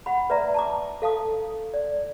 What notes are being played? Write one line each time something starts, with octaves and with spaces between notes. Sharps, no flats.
F#5 B5
B4 D5 E5 A#5
A5 A#5 D6
A4 F5 A5 D#6
D5